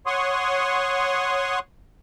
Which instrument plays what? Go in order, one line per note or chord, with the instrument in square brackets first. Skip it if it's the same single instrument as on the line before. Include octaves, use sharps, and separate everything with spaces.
[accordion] C#5 F#5 C6 C#6 D#6